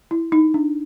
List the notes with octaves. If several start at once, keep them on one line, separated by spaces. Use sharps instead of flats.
E4
D#4
D4